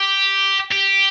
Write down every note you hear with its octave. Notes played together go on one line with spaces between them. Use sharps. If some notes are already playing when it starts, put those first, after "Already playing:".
Already playing: G4
G4